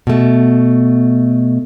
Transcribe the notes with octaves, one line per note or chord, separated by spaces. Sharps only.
B2 A3